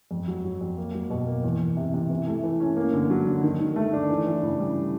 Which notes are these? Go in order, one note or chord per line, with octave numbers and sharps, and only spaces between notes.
F2
F#3
F#3
F2
A#3
F#3
B2
A#3
E2
E2
C3
C3
E3
A3
E3
C#4
A#3
D3
F#3
D3
D#3
D#3
A3
D4
E3
E3
C#3
G3